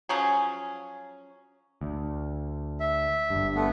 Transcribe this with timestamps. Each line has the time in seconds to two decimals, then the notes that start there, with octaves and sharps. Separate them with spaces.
0.09 F3 F#3 C#4 G#4
1.81 D2
2.80 E5
3.30 G1 G2
3.55 A3 B3